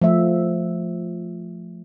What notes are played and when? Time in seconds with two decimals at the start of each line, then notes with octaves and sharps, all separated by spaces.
0.02 F3 A3 E5